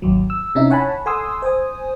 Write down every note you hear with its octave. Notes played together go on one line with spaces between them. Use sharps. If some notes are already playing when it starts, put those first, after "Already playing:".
G#1 D#2 F#3
E6
C3 C#4 D#4 E4 E5
C#5 F#5 G#5 A5 B5
A4 F#5 G#5 C6 D#6 E6
C5 G#5 D#6